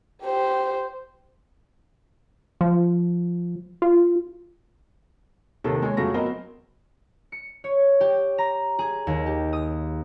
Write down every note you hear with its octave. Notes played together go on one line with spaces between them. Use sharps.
G4 C5
F3
F4
D#2 C3 D#3 A4
G#3 C#5
F2 C#3 F#3 A3 C#6 A#6
F#3 B3 C4 A#4 C5 D#5
C#7
C#5
G4
A#5
G#4
D#2
G4
D#6